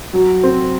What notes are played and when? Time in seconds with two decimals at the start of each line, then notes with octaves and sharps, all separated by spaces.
0.13 F#3
0.43 C4